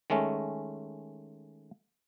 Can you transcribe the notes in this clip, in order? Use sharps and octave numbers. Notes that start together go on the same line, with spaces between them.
D#3 G#3 A3 C#4